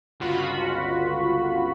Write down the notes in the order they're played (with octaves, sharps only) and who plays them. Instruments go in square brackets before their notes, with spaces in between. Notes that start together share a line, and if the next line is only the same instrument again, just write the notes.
[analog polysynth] G1 C#2 F4 F#4 B5